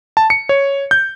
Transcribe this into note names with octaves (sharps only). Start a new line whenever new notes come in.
A5
C#7
C#5
G6